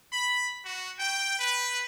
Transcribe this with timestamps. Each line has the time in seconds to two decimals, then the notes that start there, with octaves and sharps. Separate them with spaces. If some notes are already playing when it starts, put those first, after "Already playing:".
0.12 B5
0.65 F#4
0.99 G5
1.39 B4